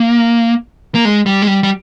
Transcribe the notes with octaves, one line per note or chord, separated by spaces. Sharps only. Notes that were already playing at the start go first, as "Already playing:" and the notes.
Already playing: A#3
A#3
G#3
G3
G#3
G3
G3